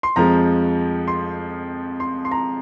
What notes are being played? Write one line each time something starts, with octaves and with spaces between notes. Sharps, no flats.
C6
F2 F3 G#3 A#5
C6
C6
C6
A#5